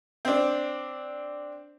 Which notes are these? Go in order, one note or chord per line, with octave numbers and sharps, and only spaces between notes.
C4 D4